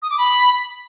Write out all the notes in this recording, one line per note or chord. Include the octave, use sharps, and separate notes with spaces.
D#6
D6
B5